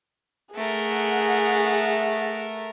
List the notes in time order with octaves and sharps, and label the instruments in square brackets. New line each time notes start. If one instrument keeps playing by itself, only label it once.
[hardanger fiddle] A3 A#4 [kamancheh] G#4 F#5